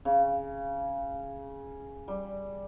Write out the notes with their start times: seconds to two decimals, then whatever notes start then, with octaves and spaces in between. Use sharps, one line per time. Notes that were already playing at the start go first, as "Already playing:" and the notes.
0.05 C#3
2.08 G3